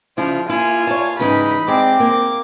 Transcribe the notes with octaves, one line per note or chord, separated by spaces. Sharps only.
C#3 F3 E4
A#3 E4 F4 G#5
C#5 A5
G#2 C#3 E3 D#4 B5
G#3 C4 D6
A#3